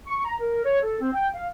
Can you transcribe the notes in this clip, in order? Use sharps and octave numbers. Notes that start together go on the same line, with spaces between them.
C#6
A#5
A#4
C#5
A4
C4
G5
F5